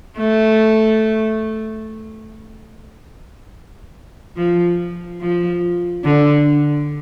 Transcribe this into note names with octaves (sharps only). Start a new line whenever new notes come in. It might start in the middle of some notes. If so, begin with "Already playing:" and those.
A3
F3
F3
D3